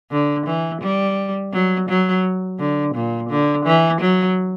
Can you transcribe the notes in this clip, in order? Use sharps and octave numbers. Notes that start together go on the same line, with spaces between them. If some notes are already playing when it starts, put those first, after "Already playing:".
D3
E3
G3
F#3
F#3
D3
A#2
D3
E3
F#3